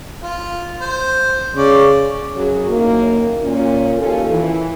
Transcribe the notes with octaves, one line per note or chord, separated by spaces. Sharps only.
F4
C5
C#3 C#4 D5
F#2 C#3 F#3 C#4 G#4
F#2 A2 D#3 A#3
A#2 C#4
D#2 C#4 F4 A4
E3